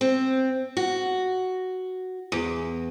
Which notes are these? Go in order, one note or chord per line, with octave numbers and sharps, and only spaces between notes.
C4
F#4
E2